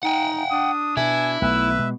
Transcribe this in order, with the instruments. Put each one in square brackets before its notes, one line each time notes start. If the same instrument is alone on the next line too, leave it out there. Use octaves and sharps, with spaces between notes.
[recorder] D#4 [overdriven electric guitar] F#5 G5
[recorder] D4 [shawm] D#6
[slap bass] B2 [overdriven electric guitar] E4 [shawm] G#5
[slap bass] B1 A3 [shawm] B4 [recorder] E5
[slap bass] B2 G#3